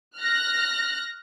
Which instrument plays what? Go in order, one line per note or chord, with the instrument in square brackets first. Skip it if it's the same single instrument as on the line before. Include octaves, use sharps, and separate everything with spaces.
[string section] F6 F#6 A#6